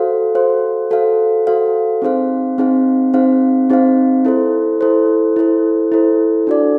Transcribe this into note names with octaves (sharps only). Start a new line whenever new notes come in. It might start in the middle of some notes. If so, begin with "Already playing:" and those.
Already playing: F#4 A4 C5 F5
F#4 A4 C5 F5
F#4 A4 C5 F5
F#4 A4 C5 F5
C4 D#4 G#4 C5 F5
C4 D#4 G#4 C5 F5
C4 D#4 G#4 C5 F5
C4 D#4 G#4 C5 F5
E4 A4 C5
E4 A4 C5
E4 A4 C5
E4 A4 C5
D4 F#4 A4 D5